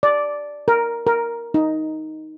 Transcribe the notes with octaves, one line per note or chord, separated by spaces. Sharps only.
D5
A#4
A#4
D#4